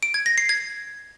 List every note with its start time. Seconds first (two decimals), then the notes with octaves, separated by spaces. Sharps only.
0.03 D7
0.14 G#6
0.26 A#6
0.38 C7
0.49 G#6